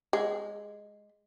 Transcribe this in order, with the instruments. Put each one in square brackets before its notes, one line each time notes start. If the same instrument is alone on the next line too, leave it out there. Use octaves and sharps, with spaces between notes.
[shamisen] G#3